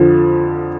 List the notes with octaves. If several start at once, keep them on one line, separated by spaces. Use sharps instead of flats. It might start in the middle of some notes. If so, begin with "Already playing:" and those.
Already playing: F2 D3 F3